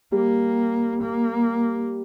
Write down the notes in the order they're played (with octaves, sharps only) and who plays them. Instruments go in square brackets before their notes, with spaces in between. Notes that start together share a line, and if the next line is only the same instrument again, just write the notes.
[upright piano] G3 [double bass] A#3
[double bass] A#3